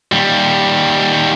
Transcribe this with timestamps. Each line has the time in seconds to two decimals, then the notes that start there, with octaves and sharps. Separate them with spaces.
0.12 D#2 G3